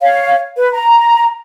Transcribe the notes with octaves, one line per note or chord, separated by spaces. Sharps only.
C#5 F5
B4
A#5